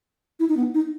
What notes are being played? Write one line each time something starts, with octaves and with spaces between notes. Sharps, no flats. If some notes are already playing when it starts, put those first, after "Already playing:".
E4
D#4
B3
D#4